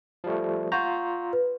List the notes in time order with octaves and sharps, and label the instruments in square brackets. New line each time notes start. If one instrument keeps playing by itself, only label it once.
[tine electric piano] F3 G3 A3
[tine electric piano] F4 A#5 [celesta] F#5 C#6 G6
[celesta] B4